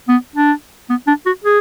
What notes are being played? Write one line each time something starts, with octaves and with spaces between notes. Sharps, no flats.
B3
D4
B3
D4
F#4
G#4